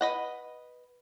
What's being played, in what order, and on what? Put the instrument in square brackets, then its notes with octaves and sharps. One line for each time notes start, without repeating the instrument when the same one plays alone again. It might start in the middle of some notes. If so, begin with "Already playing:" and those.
[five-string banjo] B4 D#5 F#5